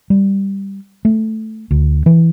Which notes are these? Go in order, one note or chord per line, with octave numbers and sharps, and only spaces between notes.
G3
A3
D2
E3